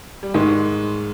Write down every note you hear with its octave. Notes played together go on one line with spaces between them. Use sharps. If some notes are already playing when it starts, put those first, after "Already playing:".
G3
G#2 D#3 G#3